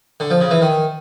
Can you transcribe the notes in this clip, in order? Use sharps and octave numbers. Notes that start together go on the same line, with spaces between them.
D3
F3
C#3
E3
D#3